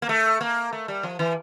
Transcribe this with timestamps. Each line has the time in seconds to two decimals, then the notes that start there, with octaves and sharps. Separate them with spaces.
0.02 A#3
0.09 A3
0.41 A#3
0.73 A3
0.88 G3
1.03 F3
1.19 E3